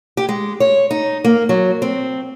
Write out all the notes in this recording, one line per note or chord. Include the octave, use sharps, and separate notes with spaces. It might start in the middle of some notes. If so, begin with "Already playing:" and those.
G4
G#3
C#5
D#4
A#3
F#3
C4